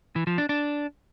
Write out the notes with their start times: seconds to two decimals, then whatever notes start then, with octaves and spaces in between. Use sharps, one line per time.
0.16 E3
0.27 F3
0.38 D4
0.49 D4